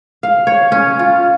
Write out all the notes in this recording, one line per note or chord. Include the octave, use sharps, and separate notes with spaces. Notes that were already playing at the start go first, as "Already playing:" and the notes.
F5
C#5
C#4
F4